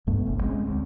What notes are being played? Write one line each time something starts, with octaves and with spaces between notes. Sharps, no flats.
C2 G2 A3 B3
G1 C2 G2
G#3 C4 C#4
D2